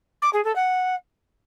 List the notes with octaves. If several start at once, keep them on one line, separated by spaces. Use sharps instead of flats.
D6
G#4
A4
F#5